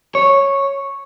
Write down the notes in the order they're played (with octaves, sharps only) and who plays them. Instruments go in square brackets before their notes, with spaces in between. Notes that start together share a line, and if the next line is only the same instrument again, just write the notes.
[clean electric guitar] C#5